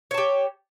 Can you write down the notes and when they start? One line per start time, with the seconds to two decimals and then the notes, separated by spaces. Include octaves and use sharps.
0.11 C#5
0.14 A5
0.18 G4